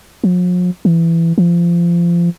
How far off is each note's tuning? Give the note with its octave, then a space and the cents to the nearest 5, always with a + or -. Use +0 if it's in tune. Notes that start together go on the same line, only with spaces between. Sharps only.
F3 +45
E3 +15
F3 -25